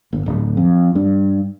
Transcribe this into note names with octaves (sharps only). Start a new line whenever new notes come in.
G1
D1
F2
G2